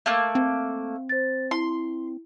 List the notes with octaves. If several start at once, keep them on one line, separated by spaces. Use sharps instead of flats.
A3 A#3 F5
C4
C5 A6
E4 C6